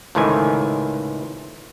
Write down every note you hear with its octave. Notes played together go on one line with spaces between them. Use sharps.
C#2 A2 C3 D#3 E3 G#5